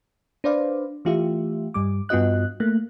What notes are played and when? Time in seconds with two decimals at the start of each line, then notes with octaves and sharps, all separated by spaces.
0.44 D4 B4 C5 D5 F5
1.05 E3 A3 F4 G4 E5
1.74 G2 G3 D6
2.09 G2 B3 F4 F#4 D#5 F#6
2.60 A3 A#3 F#6